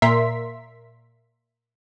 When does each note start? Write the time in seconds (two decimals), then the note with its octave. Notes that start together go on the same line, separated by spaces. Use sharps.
0.02 A#2 A#4 E5 C6 B6